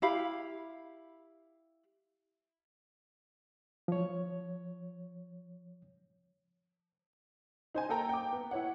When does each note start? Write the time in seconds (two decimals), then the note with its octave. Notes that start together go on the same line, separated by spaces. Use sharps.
0.02 E4 G4 F5 B5
3.88 F3 C#5
7.75 D#4 C5 G#5
7.89 A#3 A4 G5 A#5
8.09 G5 D6
8.33 B3
8.51 E4 C#5 F#5